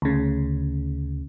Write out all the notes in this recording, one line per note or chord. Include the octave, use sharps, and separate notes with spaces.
D2 C#3